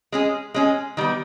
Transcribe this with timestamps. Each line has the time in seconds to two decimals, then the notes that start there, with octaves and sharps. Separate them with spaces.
0.12 G#3 C#4 G#4
0.54 G#3 C#4 G#4
0.97 D#3 G3 B3